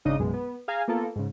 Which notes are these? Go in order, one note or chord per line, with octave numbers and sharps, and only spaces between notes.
G#1 C#3 D4 D#4 D#5 D#6
A#1 F#2 B2 G#3
B3
G#4 F5 G#5 A#5
A#3 B3 F4 A4 A#4
G#2 C#3